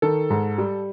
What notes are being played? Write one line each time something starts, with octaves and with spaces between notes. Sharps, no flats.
D#3 A4
G#2
G3